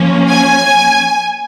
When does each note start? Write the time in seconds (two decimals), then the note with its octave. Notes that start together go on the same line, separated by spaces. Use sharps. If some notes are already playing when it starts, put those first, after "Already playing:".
Already playing: F3 A#3 C#4
0.29 G#5